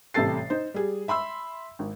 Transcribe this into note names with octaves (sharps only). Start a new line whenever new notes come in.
A1 C3 G3 A4 A6 C7
D#4 C5
G3 G#4
E5 B5 C6 E6
G#1